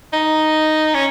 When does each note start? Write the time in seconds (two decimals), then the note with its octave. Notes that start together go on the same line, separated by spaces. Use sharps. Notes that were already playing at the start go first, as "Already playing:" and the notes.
0.13 D#4
0.95 C#4